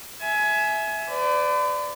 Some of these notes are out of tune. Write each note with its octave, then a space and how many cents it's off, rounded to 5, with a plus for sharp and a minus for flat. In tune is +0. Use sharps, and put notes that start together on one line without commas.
E5 +0 G#5 +25
B4 +45 D5 +0